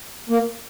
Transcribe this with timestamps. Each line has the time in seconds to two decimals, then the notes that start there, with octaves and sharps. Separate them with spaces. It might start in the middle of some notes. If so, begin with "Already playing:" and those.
0.29 A#3